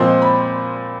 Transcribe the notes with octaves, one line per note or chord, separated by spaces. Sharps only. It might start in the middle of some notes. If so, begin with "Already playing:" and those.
Already playing: A#2 F3 G#3 C4 C6
B5